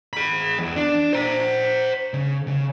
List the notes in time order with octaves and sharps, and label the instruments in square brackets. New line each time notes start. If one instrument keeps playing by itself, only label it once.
[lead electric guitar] G#4 B5
E2
D4
C5 A#5
C#3
C2 C#3